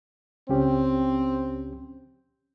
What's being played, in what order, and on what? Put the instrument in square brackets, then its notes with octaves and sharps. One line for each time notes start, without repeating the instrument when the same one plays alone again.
[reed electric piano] C#2 C#4 G4 [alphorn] C4